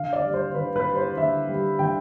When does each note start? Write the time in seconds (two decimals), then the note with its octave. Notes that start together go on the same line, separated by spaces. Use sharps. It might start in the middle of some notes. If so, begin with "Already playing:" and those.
Already playing: D3 F5
0.13 D5
0.23 G3
0.34 C5
0.55 D3 B4
0.76 B4
0.86 G3
0.96 C5
1.17 D3 E5
1.48 G3
1.79 D3 G5